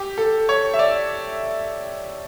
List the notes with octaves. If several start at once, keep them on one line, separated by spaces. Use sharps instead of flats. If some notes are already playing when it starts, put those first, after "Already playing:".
Already playing: G4
A4
C#5
E5
D5